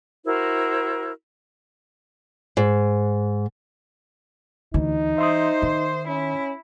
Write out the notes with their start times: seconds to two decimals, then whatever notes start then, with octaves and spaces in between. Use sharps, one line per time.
0.25 E4 F#4 A#4 C5
2.57 G#2
4.74 D2 E3 D#4
5.18 C5 E5 C6 D#6
5.62 D#3
6.08 C#4 E4